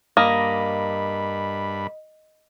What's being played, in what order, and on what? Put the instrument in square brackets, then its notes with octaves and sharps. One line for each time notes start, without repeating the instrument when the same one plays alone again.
[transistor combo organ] G2 B5 [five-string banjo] A#3 [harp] D#5